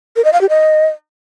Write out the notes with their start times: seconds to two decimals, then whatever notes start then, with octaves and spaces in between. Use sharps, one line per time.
0.16 A#4
0.25 D#5
0.33 F5
0.41 G4
0.49 D#5